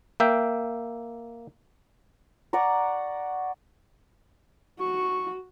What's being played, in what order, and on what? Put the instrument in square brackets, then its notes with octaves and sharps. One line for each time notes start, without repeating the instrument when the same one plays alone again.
[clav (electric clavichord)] A#3 E5 G5
[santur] D5 F#5 A#5 C#6
[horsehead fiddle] F#4 [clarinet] C#6